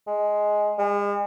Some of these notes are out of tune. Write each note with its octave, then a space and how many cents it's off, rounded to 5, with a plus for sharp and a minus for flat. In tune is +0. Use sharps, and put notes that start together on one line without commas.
G#3 +5
G#3 -40